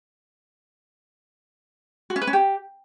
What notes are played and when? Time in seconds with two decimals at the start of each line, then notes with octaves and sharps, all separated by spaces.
2.10 F#4
2.16 C#4
2.22 B4
2.27 C#4
2.33 G4